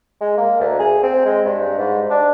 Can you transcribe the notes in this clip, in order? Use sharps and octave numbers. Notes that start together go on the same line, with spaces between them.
G#3
A#3
D2
G#4
C4
G#3
G2
G#2
D4